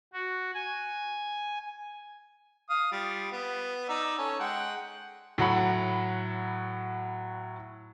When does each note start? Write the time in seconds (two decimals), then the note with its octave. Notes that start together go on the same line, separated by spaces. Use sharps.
0.13 F#4
0.54 G#5
2.70 F5 D#6
2.92 G3 F4
3.32 B3
3.89 D#4 D5 E6
4.18 C#4 A4
4.40 G#3 F#5 G5
5.38 A2 F#3 F#5 B5